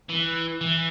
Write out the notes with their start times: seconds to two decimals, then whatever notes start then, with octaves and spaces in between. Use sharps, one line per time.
0.09 E3
0.61 E3